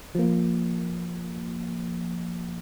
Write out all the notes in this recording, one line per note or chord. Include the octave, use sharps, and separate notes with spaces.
F3 A#3